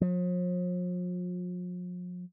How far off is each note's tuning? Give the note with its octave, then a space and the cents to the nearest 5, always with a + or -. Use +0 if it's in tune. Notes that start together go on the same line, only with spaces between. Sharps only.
F3 +45